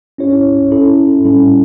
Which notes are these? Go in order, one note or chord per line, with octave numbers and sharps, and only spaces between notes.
C#4 E4 G4 C#5
C#4 E4 A4
A2 G3 C#4 E4 A4